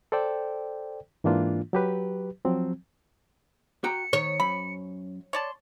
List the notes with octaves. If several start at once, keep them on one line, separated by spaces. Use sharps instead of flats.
A4 C5 D5 G5
G#2 E3 A#3 D4 F4
F#3 G4 B4
F3 F#3 C4
F#4 G5 A#5 C#7
D#3 C#5
F#2 B5
C#5 D5 A5 C6